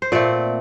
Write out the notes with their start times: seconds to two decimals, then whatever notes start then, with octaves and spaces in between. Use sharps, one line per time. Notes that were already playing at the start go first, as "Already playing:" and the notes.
0.02 C5
0.12 A#2 A3 C4 D5